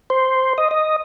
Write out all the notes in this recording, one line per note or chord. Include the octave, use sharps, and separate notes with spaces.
C5
D#5
D#5